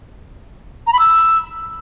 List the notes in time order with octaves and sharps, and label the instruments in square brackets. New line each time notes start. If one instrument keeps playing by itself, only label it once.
[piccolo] A#5
B5
E6